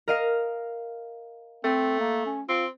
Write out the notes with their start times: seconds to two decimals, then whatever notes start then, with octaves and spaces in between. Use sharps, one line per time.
0.08 A#4 D#5 F5
1.64 A3 C4
2.00 A#3
2.26 C#4
2.49 C4 F4